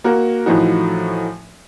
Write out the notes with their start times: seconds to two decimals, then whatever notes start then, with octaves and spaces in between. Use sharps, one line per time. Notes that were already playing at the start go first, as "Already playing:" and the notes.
0.04 A#3 F#4 A#4
0.46 A2 E3 F3 D#4 F#4